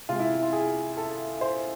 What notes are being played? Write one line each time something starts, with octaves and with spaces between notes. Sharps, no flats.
C3 G#3 F4
E4
F4
G#4
A4
C5